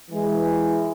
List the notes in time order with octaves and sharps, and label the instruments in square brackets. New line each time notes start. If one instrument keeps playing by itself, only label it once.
[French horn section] E3 G#3